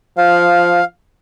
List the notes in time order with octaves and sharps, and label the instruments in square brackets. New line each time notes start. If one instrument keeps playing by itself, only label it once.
[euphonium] F3 [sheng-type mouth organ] F5